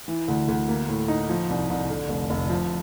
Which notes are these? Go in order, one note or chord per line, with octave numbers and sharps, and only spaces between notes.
E3
D2
D2
A#3
A2
D#4
F3
C2
C2
D3
F1
F1
F3